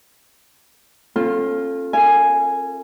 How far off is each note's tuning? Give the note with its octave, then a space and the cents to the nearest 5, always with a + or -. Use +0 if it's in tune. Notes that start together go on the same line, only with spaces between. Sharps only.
C#4 -45 F4 +0 A4 +0
A#4 -30 F5 -40 G#5 +0